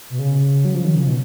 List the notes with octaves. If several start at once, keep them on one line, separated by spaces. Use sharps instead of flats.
B2
C#3
F#3
F3
D#3
C#3
B2